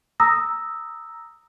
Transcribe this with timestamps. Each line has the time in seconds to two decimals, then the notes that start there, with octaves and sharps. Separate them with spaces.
0.20 A#5 D#6 E6 A#6